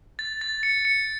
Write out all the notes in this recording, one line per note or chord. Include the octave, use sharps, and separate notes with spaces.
A6
A6
C#7
C#7